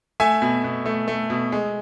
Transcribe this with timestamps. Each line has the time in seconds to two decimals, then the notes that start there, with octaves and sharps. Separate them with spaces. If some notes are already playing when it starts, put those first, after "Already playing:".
0.20 A3 E5 G#5
0.42 B2
0.64 B2
0.86 A3
1.08 A3
1.30 B2
1.52 G#3